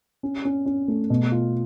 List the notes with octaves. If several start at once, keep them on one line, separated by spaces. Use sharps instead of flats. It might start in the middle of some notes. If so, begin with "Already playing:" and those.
C#4
C#4
C#4
A3
B2
F4